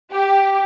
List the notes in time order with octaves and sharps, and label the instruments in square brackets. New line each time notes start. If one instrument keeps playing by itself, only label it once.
[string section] G4